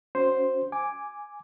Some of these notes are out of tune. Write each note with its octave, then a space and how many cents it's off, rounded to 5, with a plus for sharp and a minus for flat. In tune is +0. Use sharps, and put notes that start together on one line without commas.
C#4 +20 F#4 +0 C5 +0
G#5 +0 D6 +0